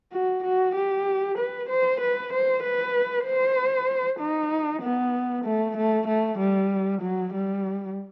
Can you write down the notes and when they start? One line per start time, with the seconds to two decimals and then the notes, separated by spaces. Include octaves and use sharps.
0.12 F#4
0.44 F#4
0.75 G4
1.38 B4
1.69 C5
2.00 B4
2.33 C5
2.63 B4
3.26 C5
4.19 D#4
4.82 B3
5.45 A3
5.77 A3
6.07 A3
6.38 G3
7.01 F#3
7.33 G3